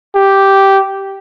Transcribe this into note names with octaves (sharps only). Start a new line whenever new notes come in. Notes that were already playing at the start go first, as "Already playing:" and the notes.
G4